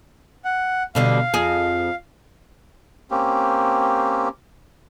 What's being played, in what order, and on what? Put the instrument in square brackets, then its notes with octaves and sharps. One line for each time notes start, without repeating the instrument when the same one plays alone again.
[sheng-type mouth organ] F#5
[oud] B2 D3 G3 [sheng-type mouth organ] F5
[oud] F2 G#4
[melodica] A#3 C4 C#4 G4